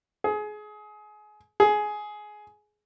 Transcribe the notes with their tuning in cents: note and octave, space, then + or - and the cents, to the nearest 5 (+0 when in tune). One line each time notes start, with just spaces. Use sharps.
G#4 +25
G#4 +15